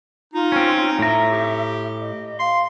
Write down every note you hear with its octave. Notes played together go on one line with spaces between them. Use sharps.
D#4 F4
C4 C#4
A2 E5 A#5
G4
D#5
F5 C6